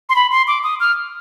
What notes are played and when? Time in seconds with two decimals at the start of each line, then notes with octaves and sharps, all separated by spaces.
0.09 C6
0.16 B5
0.31 C6
0.48 D6
0.64 D#6
0.80 F6